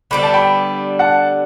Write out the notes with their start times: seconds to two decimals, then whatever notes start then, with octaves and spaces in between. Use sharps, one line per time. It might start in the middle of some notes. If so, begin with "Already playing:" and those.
0.11 D3 G3 B3 D4 B5
0.23 A5
0.34 G5 B5
0.99 F#5 A5